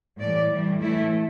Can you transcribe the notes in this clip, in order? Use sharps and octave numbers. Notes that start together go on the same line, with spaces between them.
A2 E3 G3 D5
A2 E3 G3
A2 E3 A3 E4